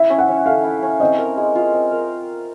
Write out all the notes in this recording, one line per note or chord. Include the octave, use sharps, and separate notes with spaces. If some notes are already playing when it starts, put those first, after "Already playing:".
Already playing: E4 E5
C#4
F#5
C#4
A4 F5
E4
C#4
C4 D#5
A#4
G#3
F4
C4
A#4